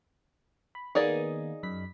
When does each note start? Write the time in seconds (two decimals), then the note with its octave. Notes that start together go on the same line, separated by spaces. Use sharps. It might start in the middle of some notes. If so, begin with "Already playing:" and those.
0.75 B5
0.95 D#3 A#3 B3 D#4 G#4 D5
1.63 F#2 B5 B6